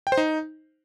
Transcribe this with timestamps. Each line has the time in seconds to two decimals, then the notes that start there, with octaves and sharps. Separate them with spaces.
0.07 G5
0.12 C5
0.17 D#4